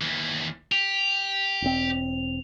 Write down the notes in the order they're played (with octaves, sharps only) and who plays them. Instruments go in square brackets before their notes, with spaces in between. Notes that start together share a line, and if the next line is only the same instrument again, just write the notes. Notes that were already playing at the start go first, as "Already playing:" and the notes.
[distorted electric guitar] D#2 E3
[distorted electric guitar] G4 [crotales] F7
[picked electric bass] E1 C4